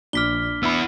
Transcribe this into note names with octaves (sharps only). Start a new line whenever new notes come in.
A#1 D4 D6 F6 B6 G7
B3 E4 B5 E6